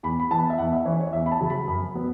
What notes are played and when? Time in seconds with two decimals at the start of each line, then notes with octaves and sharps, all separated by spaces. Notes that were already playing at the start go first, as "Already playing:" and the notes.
0.03 E2 B5
0.20 B5
0.31 E3 B3 A5
0.50 E5
0.58 E2 F#5
0.73 E5
0.85 E3 C#4 C#5
1.00 C#5
1.13 E2 E5
1.26 B5
1.32 A5
1.41 C#3 F#3
1.50 B5
1.67 F#2
1.95 F#3 B3